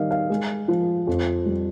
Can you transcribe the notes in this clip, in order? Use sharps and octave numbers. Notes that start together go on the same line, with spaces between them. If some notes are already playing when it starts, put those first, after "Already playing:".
Already playing: D#3 G3 D#5 F5
F5
G#3
F3
F2
G3